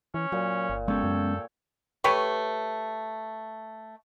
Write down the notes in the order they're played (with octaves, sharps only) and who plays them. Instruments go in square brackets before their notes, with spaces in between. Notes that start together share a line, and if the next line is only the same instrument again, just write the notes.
[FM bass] E3 [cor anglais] C#4
[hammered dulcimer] A#2 [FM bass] F#3
[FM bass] G1
[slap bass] G#3 B3 C#4 [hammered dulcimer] G4 C#5 [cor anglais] A4
[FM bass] F#2
[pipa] A3 G4 B4 C#5